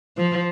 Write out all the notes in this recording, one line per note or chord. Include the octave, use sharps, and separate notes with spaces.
F3